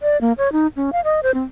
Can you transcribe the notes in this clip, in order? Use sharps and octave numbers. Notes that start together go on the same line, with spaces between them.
D5
A#3
C#5
D#4
C#4
F5
D#5
C5
C4